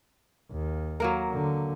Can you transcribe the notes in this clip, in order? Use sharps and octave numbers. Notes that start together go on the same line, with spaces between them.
D#2
F#3 A#3 A#4
D3